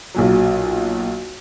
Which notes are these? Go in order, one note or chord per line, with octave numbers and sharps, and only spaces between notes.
B1 A#2 F#3